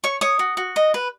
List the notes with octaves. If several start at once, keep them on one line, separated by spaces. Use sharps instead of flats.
C#5 C#6
C#5 D#6
F#4
F#4
D#5
B4